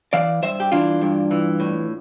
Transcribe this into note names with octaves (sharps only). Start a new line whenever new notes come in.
E3 D5 F5
G2 C5 E5
G4
E3 D4 F4
G2
E3
A2